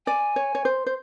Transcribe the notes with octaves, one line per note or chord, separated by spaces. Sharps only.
D5 G#5
C#5
C#5
C5
C5